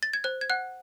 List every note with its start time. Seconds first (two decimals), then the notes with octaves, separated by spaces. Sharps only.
0.03 A6
0.13 G#6
0.24 C5 F#6
0.41 G#6
0.50 F#5 F#6